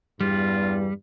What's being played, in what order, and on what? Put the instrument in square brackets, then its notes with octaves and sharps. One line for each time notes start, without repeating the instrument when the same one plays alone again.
[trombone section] E2 G2 [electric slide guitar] G3 [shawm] F4